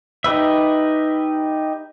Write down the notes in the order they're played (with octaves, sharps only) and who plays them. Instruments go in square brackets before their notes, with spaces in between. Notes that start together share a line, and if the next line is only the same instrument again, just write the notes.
[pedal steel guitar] D#4 G4 B4 E5